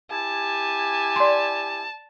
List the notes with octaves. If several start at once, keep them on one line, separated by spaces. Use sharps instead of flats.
E4 G4 G#5 A5
D5 C6